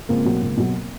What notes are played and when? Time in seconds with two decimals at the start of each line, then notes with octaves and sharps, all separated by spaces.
0.09 C#2 A#3 C4
0.25 B2 F#3
0.42 C#2
0.57 B2 F#3